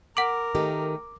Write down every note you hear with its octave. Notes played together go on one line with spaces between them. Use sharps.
A#4 F#5 D6 D7 F#7
D#3 A3 G4